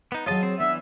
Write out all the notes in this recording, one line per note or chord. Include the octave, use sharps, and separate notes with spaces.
B3 D#4
F#3 F4 G#4 C#5 D#5 A5
C4
E3 B3 D4 E5